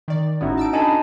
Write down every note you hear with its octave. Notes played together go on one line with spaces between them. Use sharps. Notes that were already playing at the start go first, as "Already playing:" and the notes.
D#3 D5
G#1 A2 B3 C#4 D#4 E4 F#4
A5 E6 D7
D4 A4 D#5 G#5 A5 B5